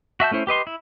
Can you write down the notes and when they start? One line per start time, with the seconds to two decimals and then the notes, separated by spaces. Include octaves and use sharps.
0.20 F#4 E5 A5 G6
0.31 A3 C#4 E4 C5
0.47 G4 B4 D#5 C6
0.67 E4